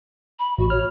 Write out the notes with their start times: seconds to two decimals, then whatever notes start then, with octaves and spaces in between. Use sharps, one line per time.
0.39 B5
0.58 A1 F#4
0.70 C#5 F6